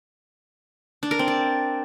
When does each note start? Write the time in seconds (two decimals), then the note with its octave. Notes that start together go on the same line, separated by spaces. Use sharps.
1.03 D4
1.11 A#4
1.19 C4
1.28 D5